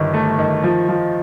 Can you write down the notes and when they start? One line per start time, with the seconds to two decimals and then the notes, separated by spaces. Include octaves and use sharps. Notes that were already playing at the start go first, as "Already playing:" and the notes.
Already playing: G1 D#3
0.14 A3
0.39 D#3
0.64 F3
0.89 F3